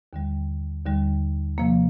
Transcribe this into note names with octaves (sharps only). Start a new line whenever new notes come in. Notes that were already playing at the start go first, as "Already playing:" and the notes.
D#2 D3 G3
D#2 D3 G3
C3 F3 A#3